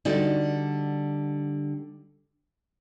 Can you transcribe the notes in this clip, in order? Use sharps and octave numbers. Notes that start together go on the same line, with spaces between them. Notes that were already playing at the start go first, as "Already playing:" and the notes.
D3 G3 D#4 F#4 D5